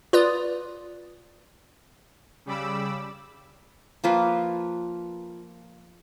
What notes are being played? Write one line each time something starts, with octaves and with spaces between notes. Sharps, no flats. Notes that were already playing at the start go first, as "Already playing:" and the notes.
F4 B4 D5 D#6
C#3 G3 B5 D6 E6
F3 A#3 F4 B4